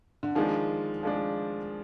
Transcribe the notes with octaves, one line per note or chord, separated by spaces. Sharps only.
D3
D#3 F3 G#3 D4
F3 G#3 D4